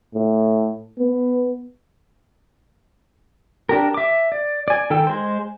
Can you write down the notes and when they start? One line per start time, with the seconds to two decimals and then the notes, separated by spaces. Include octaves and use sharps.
0.15 A2
0.99 B3
3.69 D4 G4 A#4
3.94 E5 D6
4.32 D5
4.68 D5 G#5
4.90 D#3 A4 G5 E6
5.07 G#3 C5